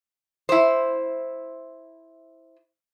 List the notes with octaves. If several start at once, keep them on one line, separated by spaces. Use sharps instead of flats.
E4 C5